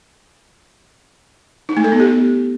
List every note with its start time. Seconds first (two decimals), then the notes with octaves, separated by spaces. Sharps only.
1.69 D#4
1.77 A3
1.84 A4
1.92 B3
2.00 G4